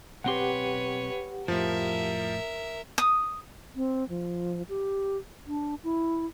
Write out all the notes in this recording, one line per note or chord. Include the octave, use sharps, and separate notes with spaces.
B1 C4 G4 B4 C#5 F#5 C6
F2 A2 F3 A#4 E5
D#6
C4
F3
G4
D4
E4